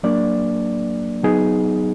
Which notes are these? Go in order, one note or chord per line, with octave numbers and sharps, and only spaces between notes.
F#3 A#3 D4 D5
F#3 B3 D#4 G#4